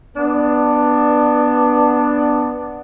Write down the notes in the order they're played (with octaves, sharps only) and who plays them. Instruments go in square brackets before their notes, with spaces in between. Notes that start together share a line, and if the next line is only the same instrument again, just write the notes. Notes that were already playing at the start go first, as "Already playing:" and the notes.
[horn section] B3 D4